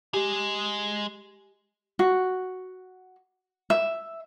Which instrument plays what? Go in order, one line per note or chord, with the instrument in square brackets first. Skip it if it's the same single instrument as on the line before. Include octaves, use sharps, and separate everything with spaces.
[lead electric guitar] G#3 G#4 [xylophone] G4
[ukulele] F#4
E5